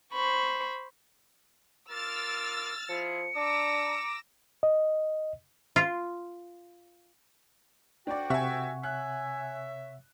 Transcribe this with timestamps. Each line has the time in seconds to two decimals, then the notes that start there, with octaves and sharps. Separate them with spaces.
0.12 C5 B5 C#6
1.91 F4 A#4 D6 E6 F6 A6
2.89 F3 E4 F4 G#4 C#7
3.36 D4 A#5 D6 E6 A#6
4.63 D#5
5.76 F4
8.07 D2 D4 F#4 D5 G5
8.30 C3 E5 F#5 G#5 C#6
8.83 C#5 E5 G#5 F#6